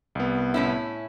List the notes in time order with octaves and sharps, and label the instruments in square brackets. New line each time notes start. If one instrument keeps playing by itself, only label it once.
[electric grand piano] C2 B3
[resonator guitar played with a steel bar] A2 C#4 E4